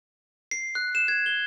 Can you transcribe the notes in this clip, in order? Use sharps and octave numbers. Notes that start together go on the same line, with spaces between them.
C7
F#6
E7
G#6
G7